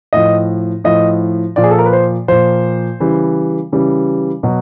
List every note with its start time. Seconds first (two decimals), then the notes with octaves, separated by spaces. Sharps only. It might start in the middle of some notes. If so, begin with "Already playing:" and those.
0.13 A2 F3 D#5
0.84 A2 F3 D#5
1.56 A#2 F3 D5
1.64 G#4
1.71 A4
1.78 A#4
1.86 B4
1.93 C5
2.28 A#2 F3 C5
3.00 C#3 E3 G3
3.72 C#3 E3 G3
4.43 B2 F#3